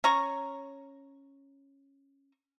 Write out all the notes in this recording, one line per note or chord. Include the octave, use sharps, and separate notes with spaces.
C#4 A#5 C#6